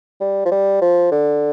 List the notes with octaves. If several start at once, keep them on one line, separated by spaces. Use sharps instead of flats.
G3
F3
G3
F3
D3